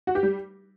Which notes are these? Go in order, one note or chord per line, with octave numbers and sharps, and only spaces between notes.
F#4
G4
G3